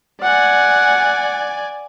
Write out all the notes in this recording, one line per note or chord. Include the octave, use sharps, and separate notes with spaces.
D5 F#5 G#5